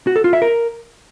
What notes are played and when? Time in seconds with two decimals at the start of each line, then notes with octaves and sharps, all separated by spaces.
0.07 F#4
0.16 A4
0.24 F4
0.33 E5
0.42 A#4